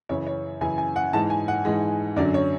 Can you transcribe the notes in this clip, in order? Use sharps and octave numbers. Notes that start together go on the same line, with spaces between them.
F#2 C#3 E3 C#5
C#5
F#2 C#3 E3 G#5
G#5
F#5
G#2 E3 G#3 A5
G#5
F#5
G#2 E3 G#3
F#2 D3 F#3 D5
C#5